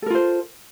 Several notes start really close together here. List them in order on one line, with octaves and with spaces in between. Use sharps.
A4 A#4 F4 C5